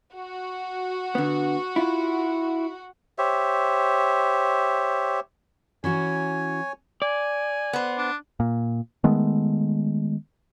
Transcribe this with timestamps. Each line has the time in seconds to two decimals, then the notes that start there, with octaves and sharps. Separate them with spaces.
0.13 F#4
1.15 D3 B3
1.76 E4 F4
3.18 G4 C5 C#5 E5
5.84 E3 C#4 F#4 C#5 G#5
7.02 D5 G#5
7.73 B3 C5
7.98 D4
8.40 A#2
9.04 D#3 G#3 A3 B3